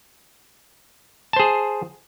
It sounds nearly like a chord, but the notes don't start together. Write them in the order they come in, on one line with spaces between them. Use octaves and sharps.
A5 C5 G#4